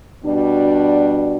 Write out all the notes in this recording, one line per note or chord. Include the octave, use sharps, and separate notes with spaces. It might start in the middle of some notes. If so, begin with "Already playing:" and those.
B2 G3 D4 F#4